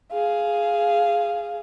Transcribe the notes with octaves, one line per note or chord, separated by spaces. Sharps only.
G#4 F5